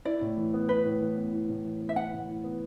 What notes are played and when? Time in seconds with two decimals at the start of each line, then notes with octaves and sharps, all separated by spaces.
0.05 E4 D5
0.21 A2
0.37 E3
0.54 B3
0.69 E4 B4
0.85 A2
1.01 E3
1.17 B3
1.33 E4
1.49 A2
1.65 E3
1.80 B3
1.89 E5
1.96 E4 F#5
2.13 A2
2.28 E3
2.44 B3